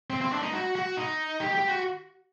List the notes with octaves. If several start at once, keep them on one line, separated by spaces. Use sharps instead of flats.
C4
C4
D4
D#4
F#4
F#4
D#4
G4
G4
F#4